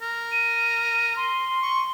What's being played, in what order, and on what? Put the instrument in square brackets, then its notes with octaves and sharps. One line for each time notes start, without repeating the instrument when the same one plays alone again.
[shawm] A#4
[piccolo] D#7
C6
[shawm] C#6